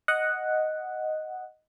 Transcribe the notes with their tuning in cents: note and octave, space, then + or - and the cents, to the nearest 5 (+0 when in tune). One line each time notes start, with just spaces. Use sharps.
D#5 +0 F#5 +0